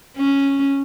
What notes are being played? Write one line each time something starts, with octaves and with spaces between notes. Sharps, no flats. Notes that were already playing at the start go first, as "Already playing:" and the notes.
C#4